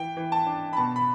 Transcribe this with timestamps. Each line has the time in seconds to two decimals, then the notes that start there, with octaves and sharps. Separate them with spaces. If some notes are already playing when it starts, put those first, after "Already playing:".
Already playing: E3 G5
0.17 E3
0.32 A5
0.46 D4
0.73 B5
0.77 B2 A5
0.96 B5